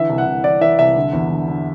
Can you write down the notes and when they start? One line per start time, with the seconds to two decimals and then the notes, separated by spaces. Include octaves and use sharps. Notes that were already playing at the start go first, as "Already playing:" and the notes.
Already playing: D3 E3 E5
0.10 C2
0.18 F#5
0.27 C2
0.44 E3 D5
0.61 E3 E5
0.79 C2 E5
0.96 D3
1.13 E2
1.31 D3
1.48 D3